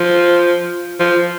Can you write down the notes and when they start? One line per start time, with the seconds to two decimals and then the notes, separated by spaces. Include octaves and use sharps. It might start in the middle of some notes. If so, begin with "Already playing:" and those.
Already playing: F3
1.00 F3